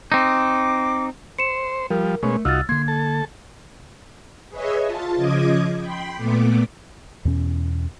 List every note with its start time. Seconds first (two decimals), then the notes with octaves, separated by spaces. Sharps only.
0.12 C4 D#4 D6
1.39 C5 C#7 E7
1.90 F3 G3 A#4
2.23 B2 G#3 A3 C#4
2.45 C2 D#4 F4 F#4 E6 F6 A6
2.69 D3 A#3 C6 G#6
2.88 A4 A5
4.50 G#4 B4 C#5 D#5 E5
4.85 F4 A5
5.16 C#3 F3 D#5 D6 D#6 G#6
5.80 G5 B5 C6
6.16 A#2 A3 B3 D6
7.25 E2 B2 C#4